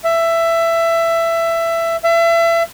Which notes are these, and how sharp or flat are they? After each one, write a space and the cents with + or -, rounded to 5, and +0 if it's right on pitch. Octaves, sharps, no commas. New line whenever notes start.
E5 +15
E5 +30